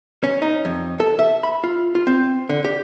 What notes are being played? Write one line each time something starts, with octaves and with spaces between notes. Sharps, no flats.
C#4
D#4
F2
A4
E5
B5
F4
F4
C4
D3
G4